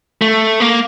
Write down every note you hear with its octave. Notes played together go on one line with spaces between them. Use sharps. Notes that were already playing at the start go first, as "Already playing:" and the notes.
A3
A#3